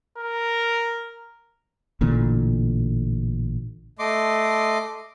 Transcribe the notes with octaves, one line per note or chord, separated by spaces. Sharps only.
A#4
A1 A#2 D3
A3 D#5 C6 D6